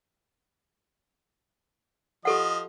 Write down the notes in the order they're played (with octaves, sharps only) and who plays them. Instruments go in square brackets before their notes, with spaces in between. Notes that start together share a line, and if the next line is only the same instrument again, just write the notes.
[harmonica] F3 D#5 [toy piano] G4 A4 F#5